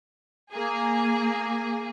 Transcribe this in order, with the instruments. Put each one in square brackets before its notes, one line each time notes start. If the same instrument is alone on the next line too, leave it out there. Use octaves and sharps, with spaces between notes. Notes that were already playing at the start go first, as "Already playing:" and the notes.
[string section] A#3 G#4